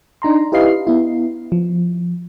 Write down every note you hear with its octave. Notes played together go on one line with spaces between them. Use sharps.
D4 D#4 A#5 C6
E4 G4 B4 D#5 F5 C7
B3 E4
F3